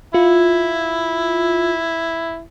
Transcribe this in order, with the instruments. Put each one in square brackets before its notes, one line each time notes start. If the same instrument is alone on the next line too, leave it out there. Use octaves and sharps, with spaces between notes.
[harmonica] E4 [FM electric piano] F4